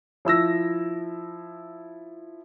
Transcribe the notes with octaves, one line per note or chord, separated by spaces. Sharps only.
F3 E4 E6 A#6